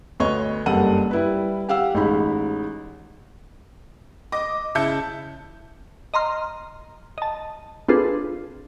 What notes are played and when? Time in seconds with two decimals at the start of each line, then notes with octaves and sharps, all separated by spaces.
0.20 D2 B3 C#5 D#5 C#6
0.66 F#1 G2 A4 F#5 D#7
1.11 G3 E4 B4
1.69 G4 F5 F#5 E6
1.94 A1 G#3 D#4 B5
4.32 D#5 D6 A#6
4.75 C#3 E4 E5 A5 G6 C#7
6.14 D#5 A#5 C6 F6
7.18 D#5 A5
7.88 C4 D4 F4 G#4 A4 B4